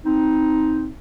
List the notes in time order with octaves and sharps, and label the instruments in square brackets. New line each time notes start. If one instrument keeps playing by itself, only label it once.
[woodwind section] C4 D#4